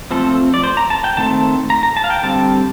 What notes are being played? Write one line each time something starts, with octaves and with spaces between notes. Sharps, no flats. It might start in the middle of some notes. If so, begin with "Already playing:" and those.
F3 A3 C4 A4
D5
C5
A#5
A5
G5
D#3 A3 C4 A5
A#5
A#5
A5
F5
G5
D3 G3 C4 A5